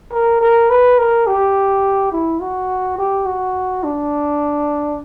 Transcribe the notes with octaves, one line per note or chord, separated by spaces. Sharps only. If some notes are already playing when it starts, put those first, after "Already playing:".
A#4
A#4
B4
A#4
G4
E4
F#4
G4
F#4
D4